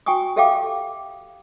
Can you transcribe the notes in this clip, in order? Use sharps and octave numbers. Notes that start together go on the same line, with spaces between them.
F#4 G5 G#5 C#6 D#6
G4 A4 E5 F5 G5 D6